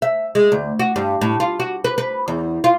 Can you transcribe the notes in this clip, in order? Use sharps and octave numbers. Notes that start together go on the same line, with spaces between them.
E5
G#3
D2
F#4
G2
A2
F4
F#4
B4
B4
E2
F4